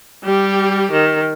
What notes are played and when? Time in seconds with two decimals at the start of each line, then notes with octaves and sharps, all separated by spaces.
0.24 G3 G4
0.92 D#3